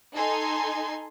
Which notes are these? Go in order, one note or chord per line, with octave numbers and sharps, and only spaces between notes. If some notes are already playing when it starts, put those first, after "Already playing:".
D#4 A4 G#5 C6